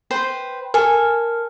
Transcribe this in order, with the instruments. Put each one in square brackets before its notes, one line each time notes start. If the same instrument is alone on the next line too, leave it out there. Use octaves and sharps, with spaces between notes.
[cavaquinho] B4 C5 G5
[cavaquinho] A4 G#5 [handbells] A#4